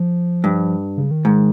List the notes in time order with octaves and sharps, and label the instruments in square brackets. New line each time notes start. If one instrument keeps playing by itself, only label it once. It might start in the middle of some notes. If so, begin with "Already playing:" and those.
Already playing: [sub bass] F3
[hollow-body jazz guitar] G2
[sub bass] C#3
D#3
[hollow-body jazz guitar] G#2